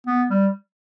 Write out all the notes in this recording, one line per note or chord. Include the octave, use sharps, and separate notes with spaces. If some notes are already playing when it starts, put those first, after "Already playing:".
B3
G3